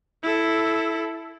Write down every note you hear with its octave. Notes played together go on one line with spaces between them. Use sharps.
E4 A4